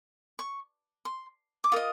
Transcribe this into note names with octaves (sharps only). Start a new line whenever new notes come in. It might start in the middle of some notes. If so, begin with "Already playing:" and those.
C#6
C6
D6
F4 A#4 D#5 D#6